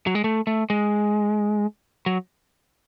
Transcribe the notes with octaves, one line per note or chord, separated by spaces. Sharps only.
F#3
G#3
A3
A3
G#3
F#3